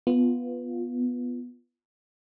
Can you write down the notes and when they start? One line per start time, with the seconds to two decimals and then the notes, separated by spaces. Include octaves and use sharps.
0.07 B3 F4